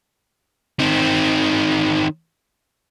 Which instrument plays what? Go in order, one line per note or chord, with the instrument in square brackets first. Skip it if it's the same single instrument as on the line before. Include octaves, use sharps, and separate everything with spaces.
[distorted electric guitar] D#3 C4